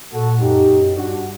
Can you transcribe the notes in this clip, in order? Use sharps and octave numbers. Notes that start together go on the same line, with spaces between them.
A#2 F#4 A4
F#2 D#4 G4
F#2
G2 D4 F#4